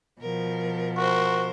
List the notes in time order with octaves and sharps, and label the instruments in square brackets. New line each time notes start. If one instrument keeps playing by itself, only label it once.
[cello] B2 F3 [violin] A#4
[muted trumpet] F#4 [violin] A#4 C5